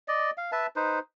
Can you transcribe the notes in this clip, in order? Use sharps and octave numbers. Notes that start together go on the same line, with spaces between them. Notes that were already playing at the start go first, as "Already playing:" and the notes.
D5 D#5
F5
B4 E5 A5
D#4 B4 C5